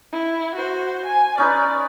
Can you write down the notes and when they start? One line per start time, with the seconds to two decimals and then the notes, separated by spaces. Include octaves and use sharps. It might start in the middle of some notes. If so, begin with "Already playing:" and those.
0.12 E4
0.55 F#4 C5
1.06 G#5
1.38 C#4 D#4 B4 D5